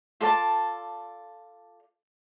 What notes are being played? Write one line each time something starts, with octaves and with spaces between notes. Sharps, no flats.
F4 A4 D5 A5